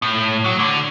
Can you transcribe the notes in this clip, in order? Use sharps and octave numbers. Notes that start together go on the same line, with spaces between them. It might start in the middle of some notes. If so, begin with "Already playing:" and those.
A2
F#3
D3